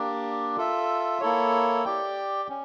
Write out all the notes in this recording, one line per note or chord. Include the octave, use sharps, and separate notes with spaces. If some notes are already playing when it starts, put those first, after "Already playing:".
Already playing: A#3 D4 G4 D5
F4 A4 E5
A#3 E4 A4 C#5
G4 D5 G5
C#4